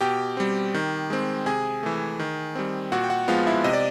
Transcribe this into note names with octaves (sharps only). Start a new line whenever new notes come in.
B2 G4 G5
G3 C4
D#3
G#3 C4
C3 G#4 G#5
E3 A3
D#3
G3 C4
A#2 F#4 F#5
G5
F#4 F#5
F3 G#3 B3 F4 F5
E4 E5
C3 D#5
D5